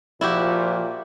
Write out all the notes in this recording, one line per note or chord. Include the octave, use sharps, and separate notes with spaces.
A#2 F3 E4 F#4 G4